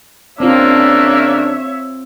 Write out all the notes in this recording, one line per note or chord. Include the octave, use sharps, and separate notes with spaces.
C#3 A#3 C4 D4 F4 C#5 E5